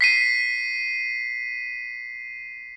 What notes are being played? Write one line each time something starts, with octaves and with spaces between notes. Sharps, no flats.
B6 C7 D#7